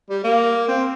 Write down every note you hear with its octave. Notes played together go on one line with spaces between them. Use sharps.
G3
A#3
C4